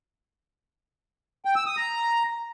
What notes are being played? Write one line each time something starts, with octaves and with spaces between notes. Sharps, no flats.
G5
E6
D#6
A#5